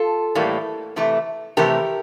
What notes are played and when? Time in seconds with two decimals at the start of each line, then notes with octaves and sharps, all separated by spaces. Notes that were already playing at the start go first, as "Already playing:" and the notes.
Already playing: F4 A4
0.35 A2 E3 G3 A#3
0.96 C3 E3 A3
1.57 C3 E3 A3 G4 A#4